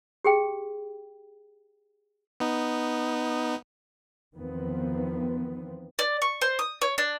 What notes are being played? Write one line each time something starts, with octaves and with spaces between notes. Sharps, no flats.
G4 G#4 G5
B3 D#4
E2 D#3 F3 B3 C4
D5
C#6
C5
D#6
C#5
D4